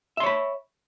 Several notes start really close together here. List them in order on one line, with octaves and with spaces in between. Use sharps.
E5 C6 C#5 B5